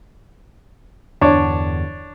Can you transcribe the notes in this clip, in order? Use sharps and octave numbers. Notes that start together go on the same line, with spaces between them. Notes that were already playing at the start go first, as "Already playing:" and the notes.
E2 G2 D3 D4 C#5